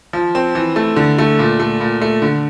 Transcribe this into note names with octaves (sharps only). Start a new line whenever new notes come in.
F3
C4
E3
A3
D3
A3
A#2
A3
A#2
A3
D3